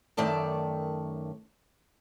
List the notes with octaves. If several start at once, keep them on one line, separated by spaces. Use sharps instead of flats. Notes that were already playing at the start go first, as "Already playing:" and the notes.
F#2 D#3 A3 D5 A5